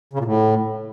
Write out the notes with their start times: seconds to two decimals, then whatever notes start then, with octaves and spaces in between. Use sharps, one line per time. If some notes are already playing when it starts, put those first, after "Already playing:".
0.13 C#3
0.19 A#2
0.24 A2